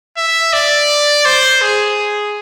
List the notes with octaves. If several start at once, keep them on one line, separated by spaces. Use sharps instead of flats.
E5
D5
C5
G#4